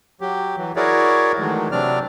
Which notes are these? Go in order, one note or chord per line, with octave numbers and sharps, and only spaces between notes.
F#3 G4
E3 F#3
E4 F#4 G#4 A#4 C#5 D5
D#3 E3 F#3 G#3 A3
C3 F#3 C4 D4 D5 F6